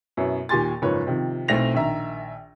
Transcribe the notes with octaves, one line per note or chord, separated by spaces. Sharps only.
F#2 B2 E4 C#5
D#2 A#2 G4 G#5 C6 A6
F#1 G#2 F3 B4 C#5
C3 D#3 F3
B1 A3 C4 E4 A#6 F7
A#1 D#3 E5 A#5